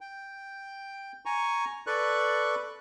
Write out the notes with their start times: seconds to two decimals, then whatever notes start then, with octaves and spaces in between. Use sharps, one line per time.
0.01 G5
1.26 G#5 A#5 C#6
1.87 A4 B4 D5 C#6 F#6